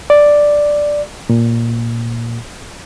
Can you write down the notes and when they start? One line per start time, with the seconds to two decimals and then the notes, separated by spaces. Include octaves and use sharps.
0.10 D5
1.29 A#2